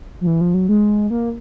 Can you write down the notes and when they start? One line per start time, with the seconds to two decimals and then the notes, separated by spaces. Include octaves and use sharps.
0.21 F3
0.27 E3
0.41 F3
0.54 F#3
0.69 G#3
1.10 A#3